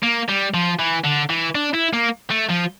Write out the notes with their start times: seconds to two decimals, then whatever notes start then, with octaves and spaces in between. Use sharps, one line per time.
0.03 A#3
0.29 G3
0.54 F3
0.79 E3
1.05 D3
1.30 E3
1.55 D4
1.74 E4
1.93 A#3
2.31 A3
2.50 F3